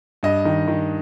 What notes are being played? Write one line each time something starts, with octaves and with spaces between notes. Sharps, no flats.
G2 D#5
D#3
D#3